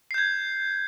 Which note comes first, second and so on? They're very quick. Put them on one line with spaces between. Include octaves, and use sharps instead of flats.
C7 G6 G#6